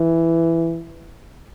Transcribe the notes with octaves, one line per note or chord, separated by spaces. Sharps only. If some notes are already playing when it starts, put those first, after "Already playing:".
Already playing: E3